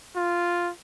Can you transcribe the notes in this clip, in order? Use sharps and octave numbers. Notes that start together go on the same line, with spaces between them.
F4